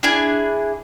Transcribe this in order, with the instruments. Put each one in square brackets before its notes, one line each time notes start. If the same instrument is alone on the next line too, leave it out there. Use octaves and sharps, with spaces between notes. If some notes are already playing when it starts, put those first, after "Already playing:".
[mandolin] D4 E4 G#4